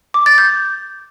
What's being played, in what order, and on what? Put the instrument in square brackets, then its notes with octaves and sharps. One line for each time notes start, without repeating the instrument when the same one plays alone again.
[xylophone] D6
A6
G6